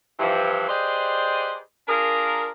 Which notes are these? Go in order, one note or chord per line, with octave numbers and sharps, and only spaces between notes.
G2 E3 F3
G4 G#4 B4 C5 D5 D#5
D4 F4 G#4 A#4